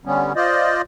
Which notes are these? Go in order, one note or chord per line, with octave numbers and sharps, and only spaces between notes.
D3 G3 B3 C#4
F4 C5 D5 D#5